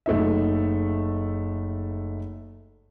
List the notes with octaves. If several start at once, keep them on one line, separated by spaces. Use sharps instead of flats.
F#1 A3 D#4 E5